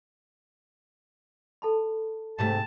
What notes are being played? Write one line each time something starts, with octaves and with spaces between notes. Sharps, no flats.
A4 A5 B5
G#2 C3 A3 A5